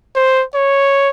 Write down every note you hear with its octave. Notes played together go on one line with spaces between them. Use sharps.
C5
C#5